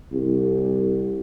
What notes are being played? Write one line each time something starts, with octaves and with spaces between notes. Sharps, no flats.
C2